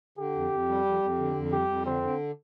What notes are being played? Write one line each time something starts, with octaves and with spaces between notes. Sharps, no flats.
D3 G4
F2
F2
G3
F2
F2
D3
F2
G3 G4
F2
D3 C4
D3